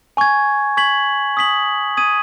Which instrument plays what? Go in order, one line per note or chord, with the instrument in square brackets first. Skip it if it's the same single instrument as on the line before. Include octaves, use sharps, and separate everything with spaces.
[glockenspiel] G#5 C#6 G#6
C#6 G#6 B6 F#7
D#6 B6 F#7
D#6 G#6 D#7